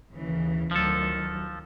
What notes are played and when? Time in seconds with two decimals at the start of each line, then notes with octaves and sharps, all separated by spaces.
0.13 D#2 C#3 E3
0.71 D2 D#3 F3 F#3 A4